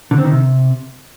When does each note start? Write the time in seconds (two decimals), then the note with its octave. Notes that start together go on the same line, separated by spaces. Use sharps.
0.11 D3
0.18 C4
0.25 D#3
0.31 C3